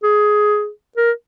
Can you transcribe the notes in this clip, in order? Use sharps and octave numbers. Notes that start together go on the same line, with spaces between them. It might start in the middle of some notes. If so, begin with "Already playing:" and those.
G#4
A#4